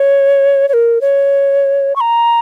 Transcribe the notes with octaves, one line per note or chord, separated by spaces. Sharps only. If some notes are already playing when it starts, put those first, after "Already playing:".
Already playing: C#5
C#5
A#4
C#5
C#6
A#5